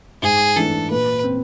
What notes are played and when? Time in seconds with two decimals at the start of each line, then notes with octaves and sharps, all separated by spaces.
0.23 G#2 G#4
0.56 E3 A3 D4 A4
0.90 A#2 B4
1.23 C4